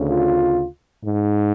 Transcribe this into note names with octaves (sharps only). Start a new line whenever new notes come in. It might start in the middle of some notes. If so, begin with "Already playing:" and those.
Already playing: D2 C#3
F4
G#2